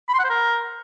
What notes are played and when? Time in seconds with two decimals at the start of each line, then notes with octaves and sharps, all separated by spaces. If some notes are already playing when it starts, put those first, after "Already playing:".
0.09 B5
0.14 C6
0.19 F#5
0.24 C5
0.30 A#4